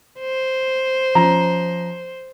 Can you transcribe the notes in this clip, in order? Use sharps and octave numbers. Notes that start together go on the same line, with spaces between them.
C5
F3 C#4 A#5